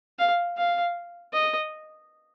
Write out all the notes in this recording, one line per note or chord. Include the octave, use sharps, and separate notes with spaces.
F5
F5
D#5